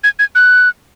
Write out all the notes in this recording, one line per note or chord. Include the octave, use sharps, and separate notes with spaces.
G#6
G#6
F#6